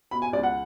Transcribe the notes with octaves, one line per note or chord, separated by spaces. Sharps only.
B2 B5
G#5
C#2 D5
F#5